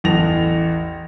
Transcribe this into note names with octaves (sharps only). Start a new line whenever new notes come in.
A1 E2 A4 A#6 F7